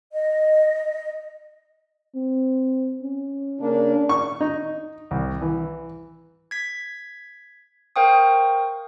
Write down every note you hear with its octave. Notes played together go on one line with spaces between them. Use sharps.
D#5
C4
C#4
C#3 A#3 D4
C#6
D#4
C2
E3
G#6 B6
A#4 C5 F5 G5 C#6 D#6